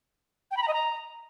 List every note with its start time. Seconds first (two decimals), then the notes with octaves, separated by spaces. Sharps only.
0.51 G5
0.57 B5
0.62 A#5
0.68 D#5
0.73 A#5